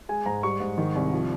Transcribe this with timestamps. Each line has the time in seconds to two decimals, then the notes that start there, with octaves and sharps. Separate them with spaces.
0.09 G#3 G#5
0.26 G#2 A#5
0.43 G3 C#6
0.60 G#2
0.78 D#3
0.96 C2
1.13 F3